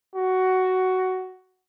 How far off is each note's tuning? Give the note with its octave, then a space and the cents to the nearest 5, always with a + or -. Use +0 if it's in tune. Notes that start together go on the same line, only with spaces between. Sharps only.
F#4 +10